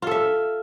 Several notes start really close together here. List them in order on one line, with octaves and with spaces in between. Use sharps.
F4 A4 E5